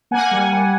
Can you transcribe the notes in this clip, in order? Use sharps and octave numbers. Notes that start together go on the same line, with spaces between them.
A#3 F#5 G#5
G3
G3